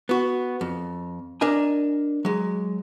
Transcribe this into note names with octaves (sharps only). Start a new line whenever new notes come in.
B3 F#4
F2
D4 A#4 D#5 G#5
F#3 G#3